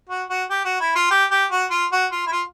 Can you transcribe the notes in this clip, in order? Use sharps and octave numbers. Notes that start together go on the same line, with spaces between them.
F#4
F#4
G4
F#4
E4
F4
G4
G4
F#4
F4
F#4
F4
E4
F4